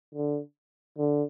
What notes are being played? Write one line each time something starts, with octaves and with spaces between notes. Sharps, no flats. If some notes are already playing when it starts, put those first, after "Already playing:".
D3
D3